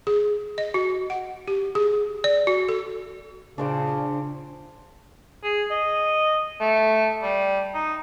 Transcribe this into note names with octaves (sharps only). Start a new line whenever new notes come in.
G#4
D#5
F#4
F#5
G4
G#4
D5
F#4
A4
A#2 C#3 D4 C5 D6
G#4
D#5
A3
G3
D#4